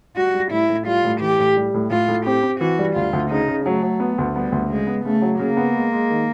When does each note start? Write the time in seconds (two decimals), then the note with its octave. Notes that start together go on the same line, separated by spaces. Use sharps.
0.16 G3 F#4
0.34 G3
0.51 A2 E4
0.69 A2
0.87 G3 F4
1.04 A2
1.21 E3 G4
1.39 A2
1.57 G3
1.74 A2
1.90 A2 F4
2.08 A2
2.26 C4 G4
2.43 C4
2.61 E3 F#4
2.79 G3
2.96 D2 F4
3.13 D2
3.30 C#3 D#4
3.48 C#3
3.66 F#3 A3
3.83 F#3
4.00 B3
4.18 D2
4.35 G3 B3
4.52 D2
4.69 C#3 G#3
4.87 B3
5.05 C#3 A3
5.22 F#3
5.39 C#3 A#3
5.57 B3
5.75 G#3
5.92 G#3
6.10 D#3